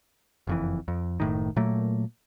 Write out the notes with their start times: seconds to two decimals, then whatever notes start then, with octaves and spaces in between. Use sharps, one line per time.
0.47 F#1 F2 E3
0.88 F2
1.20 F#1 A2 D#3
1.56 A#2 F#3 A3 A#3